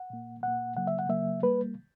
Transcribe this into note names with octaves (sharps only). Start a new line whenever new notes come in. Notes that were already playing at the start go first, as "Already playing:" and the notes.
Already playing: F#5
A#2 A#3
A#2 A#3 F#5
C#3 F#3 A#3 F#5
E5
F#5
C#3 F#3 A#3 E5
G3 A#3 B4